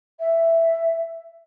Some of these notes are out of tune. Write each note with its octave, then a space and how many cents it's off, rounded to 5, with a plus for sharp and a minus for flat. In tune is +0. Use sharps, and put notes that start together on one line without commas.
E5 +5